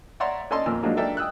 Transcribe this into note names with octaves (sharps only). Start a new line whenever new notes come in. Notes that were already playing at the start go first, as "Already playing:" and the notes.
C#5 D5 E5 F#5 A#5 C6
C#4 A4 D5 D#5 A5 C6
F2 A#2 A#4 G#5 E6
F3 F#3 G#3 A#3 D4 D#4
D4 A4 A#4 D5 E5 G5
G5 D#6 E6 F#6